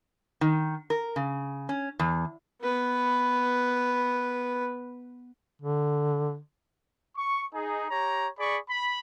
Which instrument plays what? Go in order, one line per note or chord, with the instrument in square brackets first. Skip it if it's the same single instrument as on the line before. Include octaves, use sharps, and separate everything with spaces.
[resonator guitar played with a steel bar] D#3
A#4
C#3
C#4
E2
[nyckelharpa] B3 B4
[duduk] D3
[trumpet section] C#6
D#4 G#4
G4 C#5 A#5
G#4 D5 B5 C#6
B5